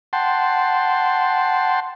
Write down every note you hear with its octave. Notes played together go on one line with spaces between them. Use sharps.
F#5 G5 A5 C6